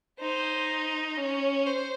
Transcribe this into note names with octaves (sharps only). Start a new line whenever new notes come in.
D#4 C5
C#4 C#5
C5